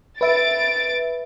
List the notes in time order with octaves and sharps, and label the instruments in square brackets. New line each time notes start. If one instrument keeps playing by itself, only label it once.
[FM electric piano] B4 E5 [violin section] A6 D7